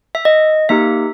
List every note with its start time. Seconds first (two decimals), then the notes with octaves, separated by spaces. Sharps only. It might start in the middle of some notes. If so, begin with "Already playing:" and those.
0.15 E5
0.25 D#5
0.69 A#3 D#4 G4 E5